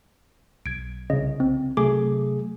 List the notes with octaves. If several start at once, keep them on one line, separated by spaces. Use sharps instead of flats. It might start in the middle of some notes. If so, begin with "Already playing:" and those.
B1 G#6 D7
C2 C#3 D#5
C4
C3 F#3 A3 G#4 D6